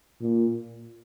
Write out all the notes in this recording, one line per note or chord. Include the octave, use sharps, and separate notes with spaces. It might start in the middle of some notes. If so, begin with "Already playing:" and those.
A#2